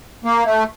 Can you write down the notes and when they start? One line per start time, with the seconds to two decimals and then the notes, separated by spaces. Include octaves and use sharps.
0.24 A#3
0.45 A3